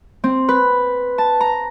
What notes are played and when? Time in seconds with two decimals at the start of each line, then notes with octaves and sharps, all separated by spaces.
0.24 C4
0.49 B4
1.18 A5
1.41 A#5